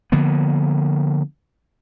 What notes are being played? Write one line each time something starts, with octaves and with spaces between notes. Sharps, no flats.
D3 F3 A#3 B3